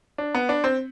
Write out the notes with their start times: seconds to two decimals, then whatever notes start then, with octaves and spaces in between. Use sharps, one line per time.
0.18 D4
0.35 B3
0.49 D4
0.64 C4